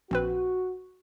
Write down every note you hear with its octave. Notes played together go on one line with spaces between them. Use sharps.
A#1 C4 F#4 B4